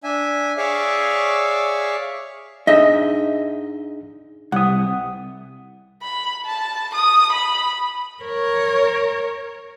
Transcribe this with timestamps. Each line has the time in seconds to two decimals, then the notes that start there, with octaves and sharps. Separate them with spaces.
0.04 D4 E5 G#5
0.58 G#4 C#5 D5 E5 F5 C#6
2.67 D4 D#4 G#4 D#5 E5
4.52 C2 F#5 D#6
6.03 B5
6.45 A5
6.95 D#6
7.33 B5
8.23 A#4 C#5